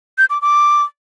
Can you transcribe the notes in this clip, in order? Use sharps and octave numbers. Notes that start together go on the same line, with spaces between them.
G6
D6
D6